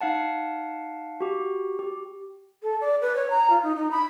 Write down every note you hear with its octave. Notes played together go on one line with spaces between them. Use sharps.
D#4 F5 F#5 A5
F#4 G4
G4
A4
D5
B4
C#5
A#5
F4
D#4
D#4
B5